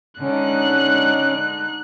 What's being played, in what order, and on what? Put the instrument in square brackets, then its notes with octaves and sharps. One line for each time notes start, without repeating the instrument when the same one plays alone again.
[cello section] D3 G#3 D#4 [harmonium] C#4 [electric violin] F#6